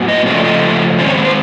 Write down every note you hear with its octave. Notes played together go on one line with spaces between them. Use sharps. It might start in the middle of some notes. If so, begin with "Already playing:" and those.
Already playing: A2 F#3 B3
D#5
C#3 F3 A3 C#4 D5
D#5
D#3 G#3 C4 D5
C#5
B4
C5